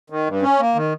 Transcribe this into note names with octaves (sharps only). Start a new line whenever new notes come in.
D#3
G2
C#4
A#3
D#3